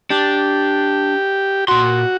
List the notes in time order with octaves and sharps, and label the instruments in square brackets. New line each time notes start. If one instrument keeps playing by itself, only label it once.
[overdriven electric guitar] D4 [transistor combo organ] G4
[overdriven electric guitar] A#2 C6 [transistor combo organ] F#4